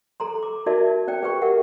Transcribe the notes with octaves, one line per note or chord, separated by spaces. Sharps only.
A4 A#5 C6
D6
D#4 F#4 A#4 D5 E5 A5
C#4 D5 G5
G#4 B4 G5 C#6
G4 A#4 E5 F#5